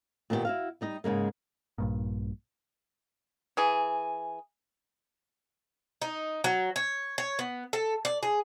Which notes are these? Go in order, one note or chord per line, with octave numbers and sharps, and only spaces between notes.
A#2 D#3 B3 D#4 G4 F#5
E4 F#4 F5
G3 D#4 D#5
G#2 C#3 G#3 A#3
A#1 G2 A#2
E3 G#4
D#4
F#3
C#5
C#5
B3
A4
D5
G#4